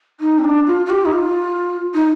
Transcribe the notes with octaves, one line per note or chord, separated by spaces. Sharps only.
D#4
C4
D4
F4
F4
G4
D#4
F4
D#4